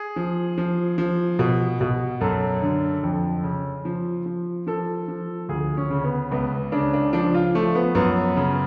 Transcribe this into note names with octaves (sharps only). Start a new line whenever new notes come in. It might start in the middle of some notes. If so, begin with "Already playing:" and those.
Already playing: G#4
F3
F3
F3
B2
B2
F#2 A4
D3
F2
C#3
F3
F3
F3 A4
F3
D2 G#4
C#4
C#3
B3
C#2 B3
C#3 D4
D4
F3 D4
F4
F3 A3
B3
F#2 B3
C#3